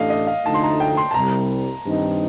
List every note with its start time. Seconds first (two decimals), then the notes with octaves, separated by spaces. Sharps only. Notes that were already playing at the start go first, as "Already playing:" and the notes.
Already playing: A1 A2 A3 D4 D#5 F5
0.10 D#5
0.27 F5
0.45 D2 D3 F3 A3 D#4 A5
0.54 C6
0.63 A#5
0.80 G5
0.97 C6
1.11 A5
1.14 C2 C3 G3 A#5
1.84 G2 D#3 G3 C4 D#4